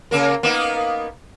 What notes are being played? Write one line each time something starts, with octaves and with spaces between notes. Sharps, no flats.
C#3 A#3 A#4
A#3 B3 D#4